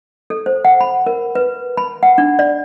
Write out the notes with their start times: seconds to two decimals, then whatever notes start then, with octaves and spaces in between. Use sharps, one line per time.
0.30 A4
0.46 C5
0.65 F#5
0.81 B5
1.06 A#4
1.35 B4
1.77 B5
2.03 F#5
2.18 D4
2.39 D5